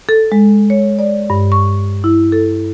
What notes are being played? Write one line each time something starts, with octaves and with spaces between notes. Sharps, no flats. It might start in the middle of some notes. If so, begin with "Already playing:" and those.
A4
G#3
C#5
D5
G2
C#6
E4
A4